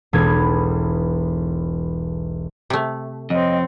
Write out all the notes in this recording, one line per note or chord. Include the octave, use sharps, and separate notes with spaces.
E1 B1 B3 G#6
C3 A3
F2 C4 C#5 D#5